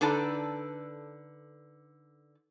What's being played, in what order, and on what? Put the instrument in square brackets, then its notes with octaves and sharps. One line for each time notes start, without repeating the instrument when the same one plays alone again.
[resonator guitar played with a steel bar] D3 D#4 A4 B4 D5 A5